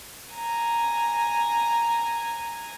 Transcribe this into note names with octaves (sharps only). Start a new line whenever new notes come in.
G#5 A#5